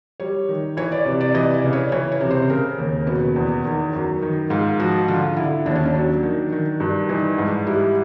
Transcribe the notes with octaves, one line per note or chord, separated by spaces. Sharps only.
G3 C#5
D#3
E3 C#5
D5
C3
D5
E3 D#5
D5
C#3
C#5
E3 C#5
C#5
C3
C5
C#3 A#4
D#2
B2 B4
E2
D#3
F#2
D#3
G#2 F4
F3 F#4
D3 F4
D3 E4
D#2 D4
C#4
D4
F#3
D#3
D#3
G2
E3 D#4
G#2
G3 E4